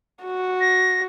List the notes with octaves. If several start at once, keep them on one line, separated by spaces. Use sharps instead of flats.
F#4
A#6